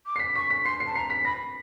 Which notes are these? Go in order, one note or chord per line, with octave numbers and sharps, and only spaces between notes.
D6
C7
B6
C#6 B6
B6
C6 C7
C7
A5
A#5 C7
B6
B5 A#6